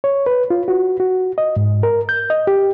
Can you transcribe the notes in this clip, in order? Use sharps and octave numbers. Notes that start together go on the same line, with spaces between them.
C#5
B4
F4
F#4
F#4
D#5
G#2
A#4
G6
D#5
G4